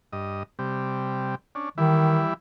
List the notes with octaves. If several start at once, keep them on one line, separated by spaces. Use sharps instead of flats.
G2 D#5
C3 G3
C#4 D4
D#3 E3 G3 E4